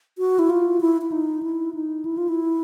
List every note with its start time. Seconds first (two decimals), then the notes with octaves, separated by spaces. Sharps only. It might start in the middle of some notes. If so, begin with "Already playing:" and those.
0.18 F#4
0.39 E4
0.50 F4
0.81 E4
1.02 E4
1.12 D#4
1.43 E4
1.74 D#4
2.05 E4
2.18 F4
2.28 E4